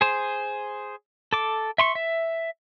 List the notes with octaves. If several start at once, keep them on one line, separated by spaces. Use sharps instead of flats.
G#4 C5
A4 D6
E5 C6 C#6
E5